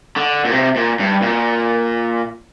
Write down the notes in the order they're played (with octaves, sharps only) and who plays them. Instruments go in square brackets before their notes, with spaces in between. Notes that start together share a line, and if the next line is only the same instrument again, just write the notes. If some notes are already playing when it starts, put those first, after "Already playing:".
[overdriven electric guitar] D3
A#2
C3
A#2
G2
A#2